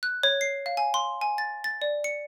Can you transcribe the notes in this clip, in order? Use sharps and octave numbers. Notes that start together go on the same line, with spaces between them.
F#6
C#5
C7
F5
G#5
C6
G#5
A6
A6
D5
C#7